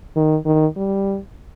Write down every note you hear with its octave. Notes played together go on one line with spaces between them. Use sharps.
D#3
D#3
G3